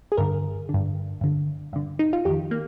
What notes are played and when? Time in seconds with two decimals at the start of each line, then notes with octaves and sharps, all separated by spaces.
0.12 G#4
0.17 G2 D3 A#4
0.69 D3
0.74 G2
1.21 G2 D3
1.73 G2 D3
1.99 D#4
2.13 F4
2.25 F2 D#3 G4
2.51 A#3